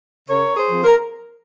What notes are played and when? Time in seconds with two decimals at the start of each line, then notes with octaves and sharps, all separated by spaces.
0.28 C#3 A#4 C#5
0.56 G#4 C5
0.70 F3 C4
0.84 A#4